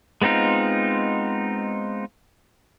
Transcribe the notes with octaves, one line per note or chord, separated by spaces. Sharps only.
G#3 B3 C4 D#4 F4